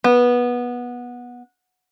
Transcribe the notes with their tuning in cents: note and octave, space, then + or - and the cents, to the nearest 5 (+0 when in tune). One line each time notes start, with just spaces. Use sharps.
B3 -15